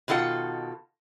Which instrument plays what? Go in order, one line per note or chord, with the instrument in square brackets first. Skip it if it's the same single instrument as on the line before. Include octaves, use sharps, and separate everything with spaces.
[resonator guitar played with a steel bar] B2 D#3 F4 A4 F#5